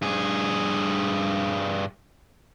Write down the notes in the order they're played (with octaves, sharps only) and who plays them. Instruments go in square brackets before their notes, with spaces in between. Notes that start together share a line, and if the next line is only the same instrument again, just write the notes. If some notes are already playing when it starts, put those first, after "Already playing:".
[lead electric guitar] G2 G#4